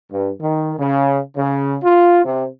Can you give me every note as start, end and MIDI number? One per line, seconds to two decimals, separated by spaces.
0.12 0.31 43
0.41 0.74 51
0.78 1.19 49
1.37 1.78 49
1.84 2.22 65
2.25 2.45 48